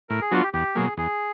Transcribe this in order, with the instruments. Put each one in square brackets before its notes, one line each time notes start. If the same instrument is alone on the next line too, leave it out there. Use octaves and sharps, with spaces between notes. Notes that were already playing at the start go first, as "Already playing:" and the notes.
[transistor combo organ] A2 [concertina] A#4
[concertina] G#4
[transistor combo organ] F#3 B3 D4 F4 [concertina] F#4
[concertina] G4
[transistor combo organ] E2 [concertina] G4
[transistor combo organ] B2 F#3 A#3 [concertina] G#4
[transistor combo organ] E2 [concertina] G#4